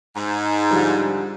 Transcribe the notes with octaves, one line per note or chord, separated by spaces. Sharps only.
G#2
D3 F3 G3